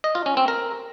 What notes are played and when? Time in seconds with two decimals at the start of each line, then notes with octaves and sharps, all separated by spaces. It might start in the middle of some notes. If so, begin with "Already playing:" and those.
0.04 D#5
0.15 F4
0.26 C#4
0.37 C4
0.48 A#4